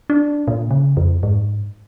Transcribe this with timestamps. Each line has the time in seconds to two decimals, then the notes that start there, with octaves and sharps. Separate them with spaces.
0.10 D4
0.48 A#2
0.71 C#3
0.97 F2
1.23 G#2